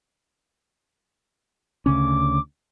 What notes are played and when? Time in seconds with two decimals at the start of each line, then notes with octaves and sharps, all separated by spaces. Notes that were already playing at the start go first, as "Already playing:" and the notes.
1.86 D2 C#3 C#4 D6